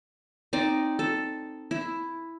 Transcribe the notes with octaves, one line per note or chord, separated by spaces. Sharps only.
C4 D#4 D5
A4
E4